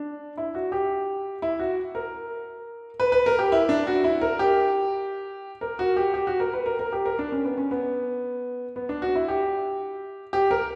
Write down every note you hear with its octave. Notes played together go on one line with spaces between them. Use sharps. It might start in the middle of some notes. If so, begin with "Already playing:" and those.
Already playing: D4
E4
F#4
G4
E4
F#4
A#4
B4
B4
A#4
G4
E4
D4
F#4
E4
A#4
G4
A#4
F#4
G4
G4
F#4
A#4
B4
A#4
A#4
G4
A#4
D4
C#4
B3
C#4
B3
B3
D4
F#4
E4
G4
G4
A#4